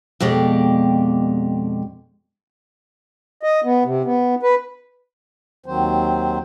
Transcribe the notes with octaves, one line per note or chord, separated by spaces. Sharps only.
F2 B2 G#3 G4 D5
D#5
B3
C3
B3
B4
D#2 D#3 F#3 C4 C5